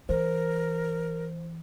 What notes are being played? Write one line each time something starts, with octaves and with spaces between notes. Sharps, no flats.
E3 A#4 C5